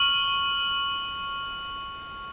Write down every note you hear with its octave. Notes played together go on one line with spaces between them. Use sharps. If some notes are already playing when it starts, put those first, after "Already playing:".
Already playing: C#6 F6 F#7